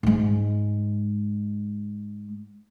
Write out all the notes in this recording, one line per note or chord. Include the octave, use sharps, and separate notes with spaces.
G#2 G#3